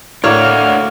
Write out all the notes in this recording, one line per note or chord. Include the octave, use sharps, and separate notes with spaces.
A2 A#3 D4 F#4 C#5 D5 F6